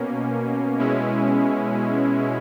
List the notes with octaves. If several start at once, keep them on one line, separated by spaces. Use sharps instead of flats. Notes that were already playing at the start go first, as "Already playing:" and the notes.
Already playing: B2 A#3 C#4
B2 G#3 C#4 E4